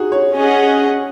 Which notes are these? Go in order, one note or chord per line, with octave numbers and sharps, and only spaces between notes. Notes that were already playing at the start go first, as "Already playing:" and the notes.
Already playing: D#4 F#4 G#4
C#5
C#4 G#4 D#5 F#5